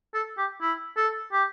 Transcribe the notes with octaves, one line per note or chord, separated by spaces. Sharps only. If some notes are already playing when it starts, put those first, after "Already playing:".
A4
G4
E4
A4
G4